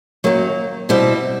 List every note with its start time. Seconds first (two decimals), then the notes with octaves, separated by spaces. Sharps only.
0.24 F#2 D#3 F#3 A#3
0.89 B2 G3 C4 E4